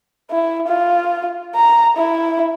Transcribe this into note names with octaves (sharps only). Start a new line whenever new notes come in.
E4
F4
A#5
E4